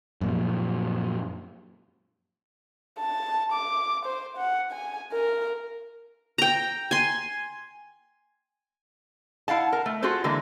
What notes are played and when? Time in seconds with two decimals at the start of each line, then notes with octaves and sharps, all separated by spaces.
0.21 F#2 A#2 F3
2.99 A5
3.52 D6
4.06 C5
4.38 F#5
4.72 G#5
5.12 A#4
6.38 G5 A#5
6.91 G#5 C6
9.48 E4 F5 F#5 A5
9.73 A#4
9.86 A3
10.03 F4 F#4 G#4 A4 C5
10.24 D3 E3 G#3 A#3 B3